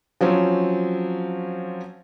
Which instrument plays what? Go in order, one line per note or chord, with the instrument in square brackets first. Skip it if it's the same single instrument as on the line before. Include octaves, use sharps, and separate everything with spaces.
[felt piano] F3 F#3 C4 C#4